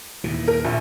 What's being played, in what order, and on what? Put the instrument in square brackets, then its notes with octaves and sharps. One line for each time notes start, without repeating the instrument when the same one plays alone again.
[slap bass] D#2 A#2 E3
[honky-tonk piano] A#4
A#1